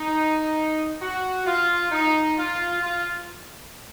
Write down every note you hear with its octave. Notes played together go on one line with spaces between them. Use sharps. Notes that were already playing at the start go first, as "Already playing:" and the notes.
Already playing: D#4
F#4
F4
D#4
F4
F4